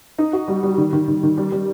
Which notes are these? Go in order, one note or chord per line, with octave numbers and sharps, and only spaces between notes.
D#4
F#4
G3
G3
D#3
D#3
D#3
D#3
G3
G3